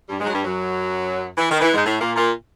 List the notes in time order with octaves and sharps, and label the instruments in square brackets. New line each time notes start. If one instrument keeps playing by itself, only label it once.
[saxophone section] G2 G3
G#2 G#3
F#3
G2 G3
F#2 F#3
E3
D#3
E3
G#2 G#3
A2 A3
A#2 A#3
A#2 A#3